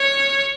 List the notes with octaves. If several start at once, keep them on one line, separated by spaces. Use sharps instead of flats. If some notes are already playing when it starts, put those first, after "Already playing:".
Already playing: C#5